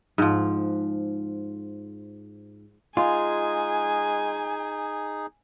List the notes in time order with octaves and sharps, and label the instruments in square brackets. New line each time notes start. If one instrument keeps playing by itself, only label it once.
[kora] G#2 F3
[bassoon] G#3 [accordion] D#4 G#4 [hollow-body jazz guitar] F4 [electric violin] G#5